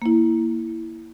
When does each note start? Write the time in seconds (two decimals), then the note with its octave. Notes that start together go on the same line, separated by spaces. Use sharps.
0.02 A#3 E4